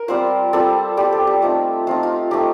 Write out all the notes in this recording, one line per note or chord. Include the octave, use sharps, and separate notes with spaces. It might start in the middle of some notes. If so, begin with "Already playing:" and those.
Already playing: A#4
G3 C4 F4 C5
G3 C4 F4 A4
G3 C4 F4 G4
A4
G4
A3 C4 D#4 F4
A3 C4 D#4 F4
F4
A3 C4 D#4 G4